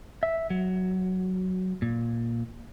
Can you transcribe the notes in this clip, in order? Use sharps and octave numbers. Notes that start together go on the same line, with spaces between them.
E5
F#3
A#2